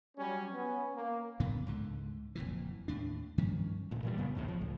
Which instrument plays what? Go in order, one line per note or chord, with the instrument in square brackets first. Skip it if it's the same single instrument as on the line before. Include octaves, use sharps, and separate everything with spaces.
[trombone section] F#3 G3 C#4
B3 C#4
A#3
[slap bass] A2 C#3 E3 B3
C#2 G#2 D3
F#1 F2 A#2 E3
D#2 A2 D4
G2 D#3 F3 C#4
[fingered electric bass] D2 A#2
A#2 E3 G3
G#1 F#2 C#3 B3
A#1 D#2 A2
F3
C#2 A2